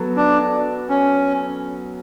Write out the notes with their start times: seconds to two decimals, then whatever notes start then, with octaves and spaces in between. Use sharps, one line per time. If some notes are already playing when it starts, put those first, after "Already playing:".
Already playing: F#3 B3 A4
0.16 D4
0.89 C#4